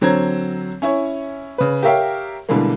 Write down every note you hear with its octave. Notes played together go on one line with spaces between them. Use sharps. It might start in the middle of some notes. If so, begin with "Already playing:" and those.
D3 F#3 C4 A#5 G#6
C#4 E4 C#5
C#3 B4
G4 A#4 C#5 E5 F5 G5
B2 D3 E3 G3 G#3 A#3